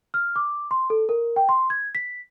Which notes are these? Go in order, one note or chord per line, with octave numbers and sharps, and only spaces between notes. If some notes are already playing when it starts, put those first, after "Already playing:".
F6
D6
C6
A4
A#4
G5
C6
G#6
B6